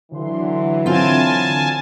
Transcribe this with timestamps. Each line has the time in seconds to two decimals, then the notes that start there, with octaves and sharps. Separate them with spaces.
0.12 D3 E3 F#3 C6
0.86 C4 F4 G#5 A5